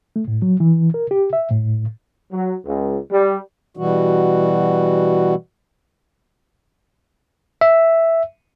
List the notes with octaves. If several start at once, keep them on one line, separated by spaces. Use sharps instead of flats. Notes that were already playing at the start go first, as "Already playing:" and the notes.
A3
A2
F#3
E3
A#4
G4
E5
A2
F#3
C#2
G3
B2 E3 G3 F#4
E5